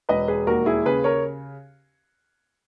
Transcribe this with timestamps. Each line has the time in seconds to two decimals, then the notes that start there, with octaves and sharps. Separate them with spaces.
0.09 E1 B4 D#5
0.28 G#4 B4
0.47 D#2 F#4 A#4
0.66 E4 G#4
0.86 C#3 G#4 B4
1.04 A#4 C#5